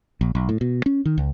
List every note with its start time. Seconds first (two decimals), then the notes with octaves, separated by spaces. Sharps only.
0.21 A#1
0.35 B1
0.49 A2
0.61 B2
0.86 C#4
1.05 D#3
1.18 C#2